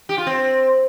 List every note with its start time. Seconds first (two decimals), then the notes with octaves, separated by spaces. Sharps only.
0.09 G4
0.18 F4
0.27 C4